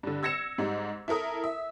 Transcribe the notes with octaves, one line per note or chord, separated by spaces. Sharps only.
G2 D3
E6 G#6 A#6 C#7 E7
G#2 G3 D#4
E4 A4 A#4 D#6
E5